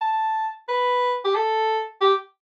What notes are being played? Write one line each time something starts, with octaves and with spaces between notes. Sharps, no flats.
A5
B4
G4
A4
G4